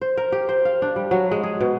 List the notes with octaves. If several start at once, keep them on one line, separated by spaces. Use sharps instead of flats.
C5
A#4
G4
C5
F5
D4
G3
F#3
G#3
G#4
B2